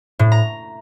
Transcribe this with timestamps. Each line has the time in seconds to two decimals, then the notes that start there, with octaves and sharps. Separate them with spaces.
0.19 A2
0.32 A#5